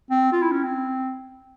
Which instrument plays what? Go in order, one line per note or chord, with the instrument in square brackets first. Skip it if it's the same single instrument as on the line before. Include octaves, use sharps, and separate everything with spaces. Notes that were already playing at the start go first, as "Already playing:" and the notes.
[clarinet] C4
F4
E4
C#4
C4